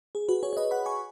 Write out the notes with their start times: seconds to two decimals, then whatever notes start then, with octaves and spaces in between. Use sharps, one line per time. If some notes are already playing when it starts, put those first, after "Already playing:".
0.15 G#4
0.29 F#4 B4
0.43 G#4 C#5
0.53 C#5
0.57 B4 D#5
0.71 F#5 B5
0.86 G#5 C#6